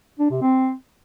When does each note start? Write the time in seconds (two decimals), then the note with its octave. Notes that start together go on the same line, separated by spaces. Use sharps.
0.19 D4
0.30 C3
0.42 C4